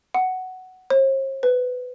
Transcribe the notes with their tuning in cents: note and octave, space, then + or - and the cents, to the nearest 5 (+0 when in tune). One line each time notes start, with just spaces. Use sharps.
F#5 +10
C5 +45
B4 +15